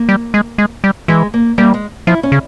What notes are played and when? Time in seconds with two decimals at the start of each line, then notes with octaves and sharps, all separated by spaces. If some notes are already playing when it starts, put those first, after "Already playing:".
Already playing: A#3
0.09 G3
0.34 G#3
0.58 G#3
0.84 G3
1.08 E3 G#3
1.34 A#3
1.58 G3 A#3
1.74 G#3
2.07 F3 E4
2.23 C#4
2.32 C#3